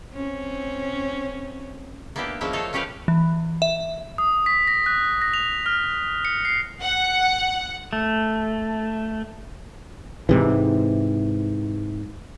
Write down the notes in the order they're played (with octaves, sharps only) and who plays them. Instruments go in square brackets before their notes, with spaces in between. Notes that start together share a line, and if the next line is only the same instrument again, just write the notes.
[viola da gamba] C4 C#4
[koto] A#3 B3 D4 E4 G4
F3 G#3 A#3 C#4 E4
A3 A#3 A4 C#5 D#5 F5
A3 C#4 G4 B4 F5
[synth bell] E3
E5
[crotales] D#6
B6
A#6
F#6
A#6
F7
F6
C#7
C7
[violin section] F#5
[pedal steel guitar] A3
[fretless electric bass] G#2 C3 E3